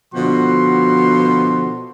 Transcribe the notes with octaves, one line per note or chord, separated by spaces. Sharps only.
B2 D3 F3 B3 F#4 C6